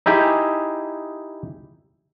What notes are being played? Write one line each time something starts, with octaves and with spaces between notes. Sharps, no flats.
D#4 E4 G4 G#4